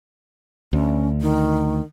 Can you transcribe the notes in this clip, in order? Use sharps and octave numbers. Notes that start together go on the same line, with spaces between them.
D2 C#4
D#3